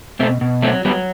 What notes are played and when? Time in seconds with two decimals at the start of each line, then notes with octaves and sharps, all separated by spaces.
0.19 B2 A3 C4
0.41 B2
0.62 F#3 A3 C4
0.85 F#3 G3 B3